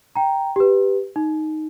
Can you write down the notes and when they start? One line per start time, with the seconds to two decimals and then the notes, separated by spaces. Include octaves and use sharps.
0.16 G5 A#5
0.56 G4 B4
1.16 D#4